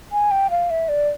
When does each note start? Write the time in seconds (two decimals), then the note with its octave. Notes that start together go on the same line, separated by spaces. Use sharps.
0.12 G#5
0.31 G5
0.50 F5
0.70 E5
0.89 D5